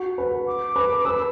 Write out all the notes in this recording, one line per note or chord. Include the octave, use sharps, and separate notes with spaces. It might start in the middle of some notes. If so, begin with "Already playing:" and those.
Already playing: F#4 F#5
B4
D6
B4
D6
B4 E6